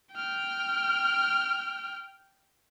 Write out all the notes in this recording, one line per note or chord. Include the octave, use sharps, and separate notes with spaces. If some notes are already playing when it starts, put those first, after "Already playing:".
G5 F6